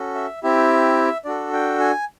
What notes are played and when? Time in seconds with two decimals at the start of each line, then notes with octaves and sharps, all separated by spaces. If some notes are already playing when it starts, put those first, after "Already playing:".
Already playing: C#4 F#4 A4
0.15 E5
0.43 C4 E4 G4 E5
1.25 D4 F#4 A4 D5
1.53 G5
1.80 G#5